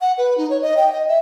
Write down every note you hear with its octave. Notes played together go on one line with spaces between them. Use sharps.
F#5
B4
D#4
C#5
D#5
G5
D#5
E5